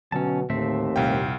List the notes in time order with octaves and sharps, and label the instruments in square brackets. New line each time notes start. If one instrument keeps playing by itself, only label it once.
[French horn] B2 [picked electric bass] D3 F#3 [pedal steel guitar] C#4 A5
[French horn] D#2 [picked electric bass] A2 D3 [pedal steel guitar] A3 C4 E5
[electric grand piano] C2 F5 G5 [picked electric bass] F2 A#2